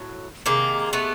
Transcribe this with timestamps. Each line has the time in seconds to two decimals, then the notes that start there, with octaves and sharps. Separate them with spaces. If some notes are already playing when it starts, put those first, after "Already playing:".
Already playing: A2 F#3
0.46 C3 D#3 G#3 A#3
0.93 A3 B3